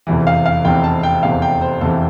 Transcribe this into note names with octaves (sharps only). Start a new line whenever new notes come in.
F1 E2 C3 E3
F5
F5
F1 E2 C3 E3 G5
A5
G5
F1 E2 C3 E3 F5
G5
C5
F1 E2 C3 E3 A4